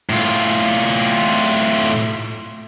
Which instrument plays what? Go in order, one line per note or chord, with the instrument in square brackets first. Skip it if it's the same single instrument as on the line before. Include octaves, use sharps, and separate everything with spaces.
[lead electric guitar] A2 F4